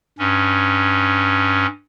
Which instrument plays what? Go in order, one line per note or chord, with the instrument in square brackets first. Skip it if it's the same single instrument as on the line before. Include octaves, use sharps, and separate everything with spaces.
[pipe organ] G2 C#4